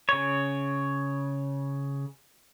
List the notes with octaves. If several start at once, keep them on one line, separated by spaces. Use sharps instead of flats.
C#3 C#5